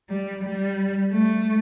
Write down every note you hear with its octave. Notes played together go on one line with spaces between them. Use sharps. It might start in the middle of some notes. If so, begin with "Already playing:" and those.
G3
G3
A3